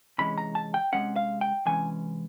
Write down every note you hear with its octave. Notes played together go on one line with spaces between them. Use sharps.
C3 E3 G#3 C#4 B5
A#5
A5
G5
C3 E3 G#3 C#4 F#5
F5
G5
C3 E3 G#3 C#4 G#5